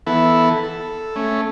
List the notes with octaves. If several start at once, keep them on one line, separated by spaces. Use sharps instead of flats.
E3 B3 E4 A4
A4
A3 C#4